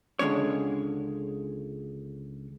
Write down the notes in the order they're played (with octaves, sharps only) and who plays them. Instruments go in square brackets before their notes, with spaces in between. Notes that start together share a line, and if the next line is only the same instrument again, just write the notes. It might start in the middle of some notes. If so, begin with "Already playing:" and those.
[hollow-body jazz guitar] C#2 D3 G#3 C#4 C#5